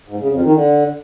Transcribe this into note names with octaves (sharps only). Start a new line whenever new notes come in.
G#2
C#3
F2
D#3
D3